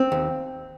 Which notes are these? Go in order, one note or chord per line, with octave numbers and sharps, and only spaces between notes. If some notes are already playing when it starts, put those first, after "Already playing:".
Already playing: C4
D#2